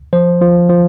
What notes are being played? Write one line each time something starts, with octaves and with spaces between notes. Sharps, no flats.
F3 C5
F3
F3